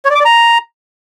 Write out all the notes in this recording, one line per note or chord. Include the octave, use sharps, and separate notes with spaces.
C#5
D5
D6
D5
A#5